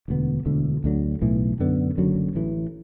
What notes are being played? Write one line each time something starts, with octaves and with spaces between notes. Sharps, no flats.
E1 D2 D3 B3
E1 D2 D3
D2 D3 F#3
B1 A2 E3
F#2 D3 B3
F#1 F#2 D3 F#3
A1 A2 E3